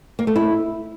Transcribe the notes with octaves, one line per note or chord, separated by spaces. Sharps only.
A#3
A3
E4